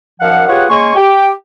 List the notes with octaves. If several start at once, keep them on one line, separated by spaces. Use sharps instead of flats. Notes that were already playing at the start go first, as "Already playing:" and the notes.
F#2 D#3 F3 F5 F#5
F4 G4 G#4 B4 C#5 F#5
C#3 G#3 A#3 G#5 C6 C#6
G4 G5